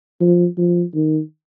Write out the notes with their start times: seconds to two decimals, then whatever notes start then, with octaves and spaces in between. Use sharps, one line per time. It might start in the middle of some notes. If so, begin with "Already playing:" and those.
0.21 F3
0.58 F3
0.95 D#3